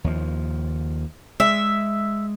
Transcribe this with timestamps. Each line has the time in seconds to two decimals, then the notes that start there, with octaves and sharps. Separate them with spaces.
0.04 D#2 F3
1.40 G#3 E5